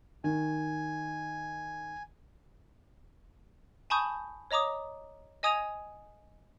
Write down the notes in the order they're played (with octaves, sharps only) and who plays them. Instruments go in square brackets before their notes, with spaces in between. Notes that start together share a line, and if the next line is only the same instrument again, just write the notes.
[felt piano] D#3 [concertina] G#5
[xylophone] G#5 A5 B5 C#6 D#6 G6
C#5 D#5 A#5 D6 D#6
D#5 G#5 D#6 G#6 D#7 F7